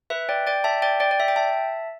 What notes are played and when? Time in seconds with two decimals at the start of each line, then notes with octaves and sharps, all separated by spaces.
0.10 B4 E5
0.29 D5 G5
0.47 D5 G5
0.64 E5 A5
0.82 D5 G5
1.00 D5 G5
1.11 D5
1.20 E5
1.28 G5
1.36 E5 A5